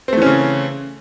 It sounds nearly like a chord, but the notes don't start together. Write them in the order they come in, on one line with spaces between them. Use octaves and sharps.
C4 A3 E3 C#4 C#3